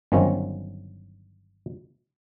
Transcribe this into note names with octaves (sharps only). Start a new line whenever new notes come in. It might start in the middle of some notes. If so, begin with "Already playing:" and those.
G1 D#3 F#3 C4 C#4